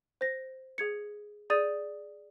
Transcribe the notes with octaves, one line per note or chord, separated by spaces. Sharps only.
C5 A#6
G#4 G#6 C#7
G#4 D5 D#6 G6 A6 D#7